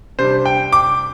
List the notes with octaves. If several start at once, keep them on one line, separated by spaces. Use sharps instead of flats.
C3 G3 D4 C5
G5
D6